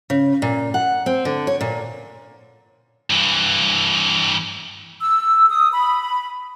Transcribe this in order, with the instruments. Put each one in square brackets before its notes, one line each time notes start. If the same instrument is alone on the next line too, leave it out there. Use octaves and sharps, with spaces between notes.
[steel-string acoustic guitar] C#3
A#2
F#5
C4
D3
C#5
A#2
[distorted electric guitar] G2 E3
[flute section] E6
D#6
B5